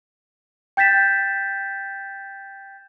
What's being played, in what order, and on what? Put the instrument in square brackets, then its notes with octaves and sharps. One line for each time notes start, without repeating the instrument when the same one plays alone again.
[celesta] G5 G6 A6 B6 E7